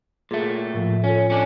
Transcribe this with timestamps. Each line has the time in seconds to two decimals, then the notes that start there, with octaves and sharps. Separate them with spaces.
0.31 A#2 A3 G#4
0.74 A2 F3
1.04 C#4 F4 A4
1.30 C#4 D4